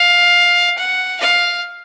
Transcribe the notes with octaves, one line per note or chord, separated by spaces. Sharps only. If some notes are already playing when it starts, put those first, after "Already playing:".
Already playing: F5
F#5
F5